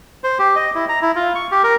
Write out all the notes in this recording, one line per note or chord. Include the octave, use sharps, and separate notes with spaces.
C5
G4
D#5
E4
A#5
E4
F4
C#6
G4
A#4